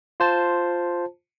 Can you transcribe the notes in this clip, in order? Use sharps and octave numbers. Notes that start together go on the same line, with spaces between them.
F4 C5 A5